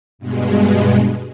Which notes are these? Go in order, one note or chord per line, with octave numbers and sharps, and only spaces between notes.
G2 B2 G#3